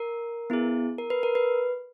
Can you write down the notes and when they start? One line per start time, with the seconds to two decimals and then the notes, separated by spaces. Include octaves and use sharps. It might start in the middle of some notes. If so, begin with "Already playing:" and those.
Already playing: A#4
0.50 B3 E4 G#4
0.98 A#4
1.10 B4
1.23 A#4
1.35 B4